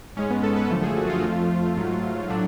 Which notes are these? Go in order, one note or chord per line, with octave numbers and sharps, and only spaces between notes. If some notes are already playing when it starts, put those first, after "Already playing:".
G#2 G#3 C#4
B3
A4
B4
F#2 D3 F3 A3 A4
G#4
F#4
F4
F2 F3 A3 F4
G#2 F#3 A3
A2 F#3 A3 D4